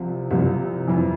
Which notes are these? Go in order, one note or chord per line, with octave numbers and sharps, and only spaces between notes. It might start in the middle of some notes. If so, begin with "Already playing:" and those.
Already playing: C2 C3 F3
C2 C3 F3
F2 E3